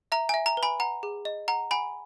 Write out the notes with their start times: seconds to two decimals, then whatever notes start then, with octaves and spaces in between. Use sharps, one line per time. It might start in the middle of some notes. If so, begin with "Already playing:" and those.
0.12 E5 A#5
0.29 G#5
0.34 E5
0.46 A#5
0.57 B4
0.63 G#5 B5
0.80 F#5 A#5
1.03 G#4
1.25 D#5
1.48 F#5 A#5
1.71 F#5 G#5 B5